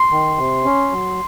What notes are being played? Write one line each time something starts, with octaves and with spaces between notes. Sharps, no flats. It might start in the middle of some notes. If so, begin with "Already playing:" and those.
Already playing: C6
D#3
C3
C#4
F#3